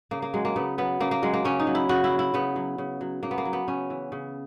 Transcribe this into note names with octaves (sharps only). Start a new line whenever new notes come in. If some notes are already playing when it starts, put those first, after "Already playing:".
C#3 A#3
A#3
F#3 G#3
A#3
C#3 B3
F#3 B3
C#3 A#3
A#3
F#3 G#3
A#3
C#3 C#4
D#4
F#3
E4
C#3 F#4
E4
F#3
E4
C#3 B3
F#3
C#3
F#3
C#3 A#3
B3
A#3
F#3
B3
C#3 C#4
E3
C#3